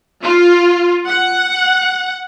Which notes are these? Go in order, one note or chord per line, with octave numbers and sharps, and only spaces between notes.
F4
F#5